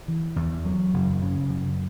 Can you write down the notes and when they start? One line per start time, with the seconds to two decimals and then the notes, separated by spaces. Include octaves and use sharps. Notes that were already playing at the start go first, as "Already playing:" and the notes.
0.08 E3
0.36 E2
0.65 F#3
0.94 F#1
1.22 C#3
1.50 F#2